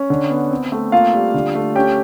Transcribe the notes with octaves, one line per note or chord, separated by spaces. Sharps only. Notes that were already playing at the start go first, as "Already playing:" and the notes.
Already playing: C#4
D3
B3
C4
A3
A#3 F4 F5
G3
D3
A3
C#4 G4 G5